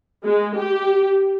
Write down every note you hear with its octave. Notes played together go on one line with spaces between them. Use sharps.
G#3
G4